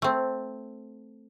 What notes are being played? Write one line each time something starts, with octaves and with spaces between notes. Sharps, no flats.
A3 C4